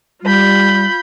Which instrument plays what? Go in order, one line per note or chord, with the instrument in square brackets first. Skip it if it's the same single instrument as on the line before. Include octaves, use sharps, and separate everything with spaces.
[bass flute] G3 [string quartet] F4 B5 G6